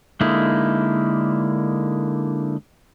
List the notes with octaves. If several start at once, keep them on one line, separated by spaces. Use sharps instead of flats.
D3 G#3 A#3 D#4 E4